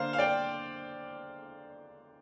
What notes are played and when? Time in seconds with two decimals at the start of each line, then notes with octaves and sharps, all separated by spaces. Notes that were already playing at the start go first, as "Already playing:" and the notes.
Already playing: D3 A#3 D4 C5 F5
0.13 F5
0.18 D5 G5